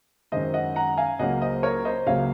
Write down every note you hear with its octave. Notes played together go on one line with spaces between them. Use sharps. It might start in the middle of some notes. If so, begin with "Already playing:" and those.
F#2 D#3 G#3 C5 D#5
D#5 F#5
F#5 A#5
F5 G#5
C#2 C#3 F#3 A#3 C#4 D#5 F#5
C5 D#5
A#4 C#5
C5 D#5
C#2 C#3 F#3 A#3 C#4 C#5 F5